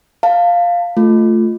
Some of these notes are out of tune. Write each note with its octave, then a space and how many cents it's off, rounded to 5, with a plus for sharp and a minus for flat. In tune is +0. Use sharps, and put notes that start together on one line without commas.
F5 +0 A5 +30
A3 +0 F4 +0